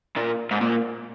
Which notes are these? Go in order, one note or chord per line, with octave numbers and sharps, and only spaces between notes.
A#2
G#2
A#2